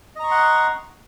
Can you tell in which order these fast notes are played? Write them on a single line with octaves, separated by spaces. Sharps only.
D#5 A#5 C#6 C6 F#5